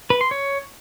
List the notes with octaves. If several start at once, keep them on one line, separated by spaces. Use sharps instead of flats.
B4
C6
C#5